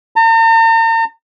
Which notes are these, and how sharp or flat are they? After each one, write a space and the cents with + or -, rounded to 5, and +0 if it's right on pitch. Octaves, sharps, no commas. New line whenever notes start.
A#5 -45